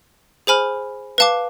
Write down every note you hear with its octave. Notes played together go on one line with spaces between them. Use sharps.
G#4 C5 G#5 B5 F6
B4 F5 A5 D6